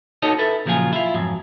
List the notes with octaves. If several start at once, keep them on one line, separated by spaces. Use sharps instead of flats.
D#4 F#4 A4 C#5 D#5
E4 A4 B4
A#2 C#3 F3 F#3 F4 G#4
E4 F4
F2 G#2 F#3